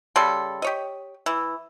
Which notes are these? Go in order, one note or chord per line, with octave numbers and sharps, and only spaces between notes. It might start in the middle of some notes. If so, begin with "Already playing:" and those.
C#3 G3 A4 C6
G4 C#5 D#5
E3